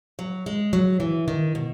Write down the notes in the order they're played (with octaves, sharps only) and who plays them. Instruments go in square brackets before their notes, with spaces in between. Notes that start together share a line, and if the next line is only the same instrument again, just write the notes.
[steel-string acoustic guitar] F#3
G#3
F#3
E3
D#3
B2